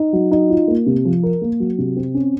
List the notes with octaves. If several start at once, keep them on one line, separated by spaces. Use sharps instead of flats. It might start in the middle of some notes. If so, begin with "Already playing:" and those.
Already playing: D#4
F#3
D#4
F4
A#3
C3
F3
A#4
A#3
F#3
C3
C4
C#4